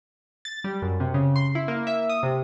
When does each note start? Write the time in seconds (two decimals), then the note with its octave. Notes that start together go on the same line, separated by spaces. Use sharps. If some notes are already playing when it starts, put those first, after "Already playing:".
0.45 A6
0.64 G3
0.82 F#2
1.00 C3
1.14 C#3
1.36 C6
1.55 E4
1.68 A#3
1.87 E5
2.09 D#6
2.23 C3